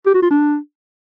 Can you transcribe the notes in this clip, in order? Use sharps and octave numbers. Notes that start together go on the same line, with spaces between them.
G4
F#4
F4
D4